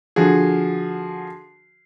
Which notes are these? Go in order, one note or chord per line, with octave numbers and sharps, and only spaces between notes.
D3 F3 F#4 G#4